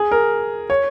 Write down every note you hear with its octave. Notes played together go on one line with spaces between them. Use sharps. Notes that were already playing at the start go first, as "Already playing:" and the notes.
Already playing: G#4
A#4
C#5